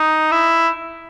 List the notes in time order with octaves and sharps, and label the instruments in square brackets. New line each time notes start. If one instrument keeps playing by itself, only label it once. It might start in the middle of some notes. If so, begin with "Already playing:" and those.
Already playing: [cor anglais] D#4
E4